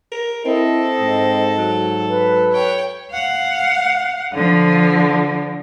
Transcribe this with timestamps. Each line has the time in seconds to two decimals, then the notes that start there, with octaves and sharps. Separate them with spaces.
0.12 A#4
0.45 C4 E4 A4 D#5
1.00 G#2
1.58 F#3
2.08 B4
2.52 C#5 G5
3.11 F5 F#5
4.34 D3 F3